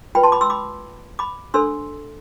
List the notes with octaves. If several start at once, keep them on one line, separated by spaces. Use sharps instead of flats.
F4 B4 G5 B5
A5 C6
B5 D6
C6 E6
B5 D6
B5 D6
D4 A4 C5 C6 E6